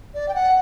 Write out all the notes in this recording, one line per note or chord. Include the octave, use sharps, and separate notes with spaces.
D5
G5
F#5